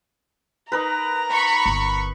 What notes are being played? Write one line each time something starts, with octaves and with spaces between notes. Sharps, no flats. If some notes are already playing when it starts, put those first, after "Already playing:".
D#4 A#4 B4 A#5
B5 C#6
G1